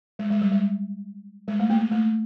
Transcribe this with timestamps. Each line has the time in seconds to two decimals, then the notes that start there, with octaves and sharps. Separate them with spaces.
0.19 G#3
0.30 G#3
0.42 G3
0.52 G#3
1.48 G#3
1.60 A3
1.70 A#3
1.81 A#3
1.91 A3